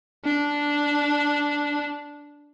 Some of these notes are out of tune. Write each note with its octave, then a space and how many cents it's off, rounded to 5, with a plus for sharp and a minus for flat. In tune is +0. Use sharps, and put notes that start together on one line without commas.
D4 -5